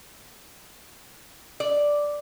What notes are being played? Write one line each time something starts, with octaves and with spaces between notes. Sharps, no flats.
D5